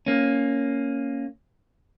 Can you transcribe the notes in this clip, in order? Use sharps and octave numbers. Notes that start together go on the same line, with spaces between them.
A#3 C#4